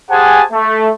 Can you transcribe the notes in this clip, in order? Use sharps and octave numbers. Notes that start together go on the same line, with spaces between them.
G4 G#4 C5 F#5 G#5 A5
A3